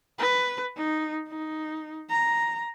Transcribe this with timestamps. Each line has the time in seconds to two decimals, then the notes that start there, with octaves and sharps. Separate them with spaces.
0.19 B4
0.77 D#4
1.28 D#4
2.09 A#5